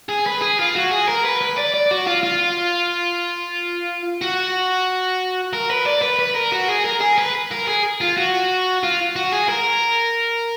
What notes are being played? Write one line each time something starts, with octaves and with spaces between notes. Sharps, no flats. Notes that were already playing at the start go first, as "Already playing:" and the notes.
G#4
B4
G#4
F4
F#4
G#4
A#4
B4
B4
D5
D5
F#4
F4
F4
F#4
A#4
B4
D5
B4
B4
A#4
F#4
G#4
A#4
G#4
B4
A#4
G#4
F4
F#4
F4
F#4
G#4
A#4